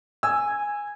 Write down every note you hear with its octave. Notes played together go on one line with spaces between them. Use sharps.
G#5 E6